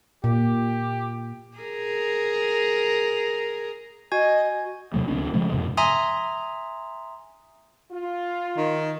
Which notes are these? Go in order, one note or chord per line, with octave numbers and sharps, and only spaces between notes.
A#2 G4
G#4 A#4
F#4 D#5 G#5 G#6
E2 C3 F#3 A3
D2 G#3 C4 D4
C#3 F3 G#3 A3
F2 G#2 C3
E5 G#5 A#5 C6 D#6
F4
D#3